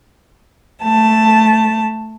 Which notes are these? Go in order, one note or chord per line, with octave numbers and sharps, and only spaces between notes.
A3 A5